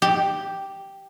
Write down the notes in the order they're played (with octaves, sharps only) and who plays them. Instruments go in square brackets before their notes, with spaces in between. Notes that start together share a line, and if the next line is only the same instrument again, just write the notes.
[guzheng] G4